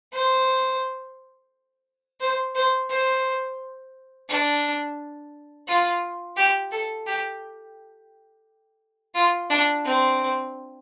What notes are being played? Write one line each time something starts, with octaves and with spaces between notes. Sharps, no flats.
C5
C5
C5
C5
D4
F4
G4
A4
G4
F4
D4
C4